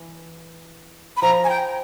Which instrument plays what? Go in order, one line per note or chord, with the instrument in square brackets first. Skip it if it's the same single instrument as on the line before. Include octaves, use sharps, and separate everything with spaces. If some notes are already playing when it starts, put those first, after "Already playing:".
Already playing: [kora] E3
[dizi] B5
[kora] F3 [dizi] A#5
[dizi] G#5
G5